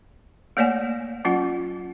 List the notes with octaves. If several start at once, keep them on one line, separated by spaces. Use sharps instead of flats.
A3 A#3 C#5 D5 F#5 G#5
F#3 C#4 F4 F#5